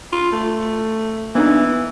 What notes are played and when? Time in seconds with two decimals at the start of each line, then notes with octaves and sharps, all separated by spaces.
0.12 F4
0.32 A3
1.35 E3 A#3 B3 D4 D#4